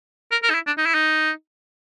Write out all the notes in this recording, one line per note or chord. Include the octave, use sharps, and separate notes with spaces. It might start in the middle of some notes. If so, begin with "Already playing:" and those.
A#4
A#4
D#4
E4
D4
D#4
E4
D#4